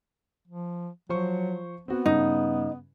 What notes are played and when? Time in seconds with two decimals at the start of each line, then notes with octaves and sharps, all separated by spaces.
0.48 F3
1.09 F3 F#3 C5 C#6
1.88 B3 C4 F#4
2.06 G2 C#3 D#4